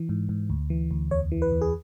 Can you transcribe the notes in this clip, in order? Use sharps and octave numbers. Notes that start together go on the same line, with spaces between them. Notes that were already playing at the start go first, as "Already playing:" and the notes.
Already playing: E3
G#2
G#2
D2
E3
D2
E2 C#5
E3
B4
E2
G#4